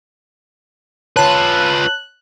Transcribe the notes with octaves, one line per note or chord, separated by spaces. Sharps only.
F4 B4 C#5 A5 F#6